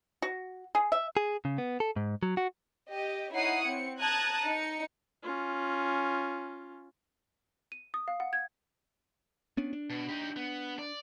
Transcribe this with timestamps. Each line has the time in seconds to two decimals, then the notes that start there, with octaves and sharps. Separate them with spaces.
0.22 F#4
0.75 G#4
0.92 E5
1.17 G#4
1.45 C#3
1.58 B3
1.80 A4
1.96 G#2
2.23 F#3
2.37 F#4
2.89 G4 D#5
3.32 D#4 E4 C#5 F#5 D#6 C7
3.64 C4 C#7
3.99 A5 A#5 D#6 F#6 G#6
4.46 D#4 C#7
5.23 C#4 F4
7.72 D#7
7.94 D#6
8.08 F5
8.20 F#5
8.33 G#6
9.57 B3 C#4 D4
9.73 D4
9.90 B2
10.09 D#4 G4
10.36 B3
10.79 D5